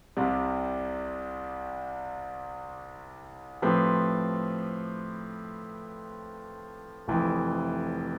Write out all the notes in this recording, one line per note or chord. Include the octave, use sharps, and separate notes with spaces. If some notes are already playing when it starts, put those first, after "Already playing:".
C2 C3 G3
A2 F3 C4 G4 B4
F1 F2 E3